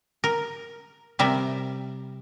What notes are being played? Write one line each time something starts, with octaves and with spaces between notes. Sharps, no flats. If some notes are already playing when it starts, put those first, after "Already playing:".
A#4
C3 G3 A#4 E5